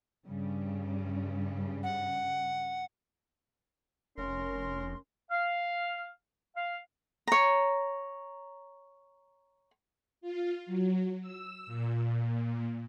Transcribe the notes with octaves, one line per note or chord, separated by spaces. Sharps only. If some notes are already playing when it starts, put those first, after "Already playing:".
G2 C#3 G3
F#5
F1 C#4 A#4 C6
F5
F5
C#5 A#5
F4
F#3
E6
A#2